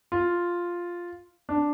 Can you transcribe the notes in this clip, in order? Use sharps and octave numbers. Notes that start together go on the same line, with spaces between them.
F4
D4